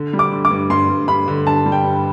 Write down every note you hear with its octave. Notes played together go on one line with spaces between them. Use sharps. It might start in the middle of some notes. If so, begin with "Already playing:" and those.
Already playing: D3
G3
D6
D3
D6
G2
G2 C6
G2
G2 B5
D3
G2 A5
G3
G5
G2